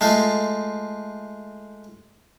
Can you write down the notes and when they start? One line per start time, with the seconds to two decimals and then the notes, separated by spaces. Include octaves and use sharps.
0.01 G#3 A3 F4